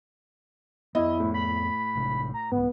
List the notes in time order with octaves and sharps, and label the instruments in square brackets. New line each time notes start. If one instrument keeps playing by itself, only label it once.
[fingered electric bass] F2 B3 [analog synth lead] E4 [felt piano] D#5
[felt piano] A2
[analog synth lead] B5
[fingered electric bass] A1 C3
[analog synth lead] A#5
[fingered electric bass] C2 G#2 [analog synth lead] B3